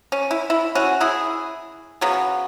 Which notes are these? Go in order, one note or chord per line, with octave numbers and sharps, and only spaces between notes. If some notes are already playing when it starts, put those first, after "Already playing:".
C#4
E4
E4
C#4 F#4
E4 G#4
C#3 F#3 B3